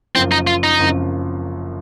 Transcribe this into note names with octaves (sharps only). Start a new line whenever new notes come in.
F#1 F#2 F3 C4
D#4
F4
D#4
F#1 F#2 F3